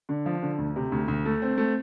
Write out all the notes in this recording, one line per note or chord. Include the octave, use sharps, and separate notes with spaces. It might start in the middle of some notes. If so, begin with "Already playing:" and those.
D3
F3
D3
D2
C3
D2
D2
A3
C4
A3